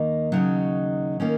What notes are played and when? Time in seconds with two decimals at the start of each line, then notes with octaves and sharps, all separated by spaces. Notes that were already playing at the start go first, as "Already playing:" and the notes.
Already playing: D#2 D#3 A#3 D#4
0.32 D#2 C#3 F#3 D#4
1.20 D#3 A#3 C#4